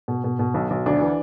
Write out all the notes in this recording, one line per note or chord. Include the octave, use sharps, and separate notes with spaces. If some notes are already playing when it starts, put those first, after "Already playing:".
B2
B2
B2
B1
B1
D2 D4
E3